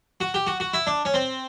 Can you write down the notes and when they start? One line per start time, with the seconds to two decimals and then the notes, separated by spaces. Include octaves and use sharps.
0.20 F#4
0.34 G4
0.47 F#4
0.60 F#4
0.73 E4
0.87 D4
1.05 C#4
1.14 C4